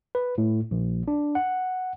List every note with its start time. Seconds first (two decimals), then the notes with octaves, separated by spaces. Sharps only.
0.15 B4
0.38 A2
0.71 A#1
1.08 D4
1.35 F#5